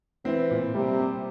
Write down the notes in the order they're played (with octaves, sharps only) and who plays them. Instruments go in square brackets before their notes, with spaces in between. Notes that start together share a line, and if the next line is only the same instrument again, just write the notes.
[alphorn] E3 [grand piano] C4
[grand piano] A#2
[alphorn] C3 [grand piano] G3
[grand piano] C4